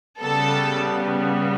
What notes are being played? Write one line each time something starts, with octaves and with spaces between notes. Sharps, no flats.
C#3 G3 B3 A4